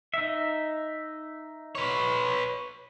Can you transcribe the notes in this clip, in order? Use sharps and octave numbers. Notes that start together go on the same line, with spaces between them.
D#4 E5
B4 C#5